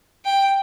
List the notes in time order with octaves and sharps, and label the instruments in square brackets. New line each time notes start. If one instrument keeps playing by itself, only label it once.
[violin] G5